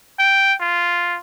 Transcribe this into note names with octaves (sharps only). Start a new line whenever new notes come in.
G5
F4